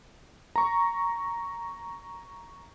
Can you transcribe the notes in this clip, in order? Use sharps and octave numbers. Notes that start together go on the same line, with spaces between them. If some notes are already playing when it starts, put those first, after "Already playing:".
A#5 C#6